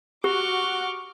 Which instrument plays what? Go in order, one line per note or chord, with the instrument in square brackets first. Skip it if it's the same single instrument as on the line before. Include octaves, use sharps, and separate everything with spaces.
[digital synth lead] F#4 [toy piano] G4 [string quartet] C#6 D6 F6 [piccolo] G7